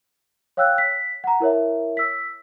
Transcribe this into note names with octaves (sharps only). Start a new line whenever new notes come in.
C#5 F5 G5 E6 F#6
B6
F#5 A#5
E4 A#4 C#5 E5
E6 B6